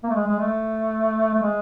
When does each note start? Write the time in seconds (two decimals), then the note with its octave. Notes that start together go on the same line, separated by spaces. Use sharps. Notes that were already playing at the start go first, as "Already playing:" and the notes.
0.03 A#3
0.10 A3
0.15 G#3
0.27 G#3
0.39 A3
1.33 A3
1.42 G#3